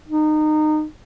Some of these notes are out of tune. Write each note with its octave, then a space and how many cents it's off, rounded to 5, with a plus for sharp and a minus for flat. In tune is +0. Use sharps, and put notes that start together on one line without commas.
D#4 -25